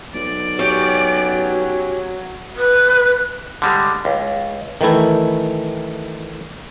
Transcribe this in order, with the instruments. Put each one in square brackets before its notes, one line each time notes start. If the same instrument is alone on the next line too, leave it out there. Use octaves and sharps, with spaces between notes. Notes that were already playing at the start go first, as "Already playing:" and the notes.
[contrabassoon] B1 [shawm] D5
[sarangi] F#3 [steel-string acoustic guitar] C#4 G4
[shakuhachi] B4
[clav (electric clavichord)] D3 G3 G#3
C#2
D#3 E3 A3 E4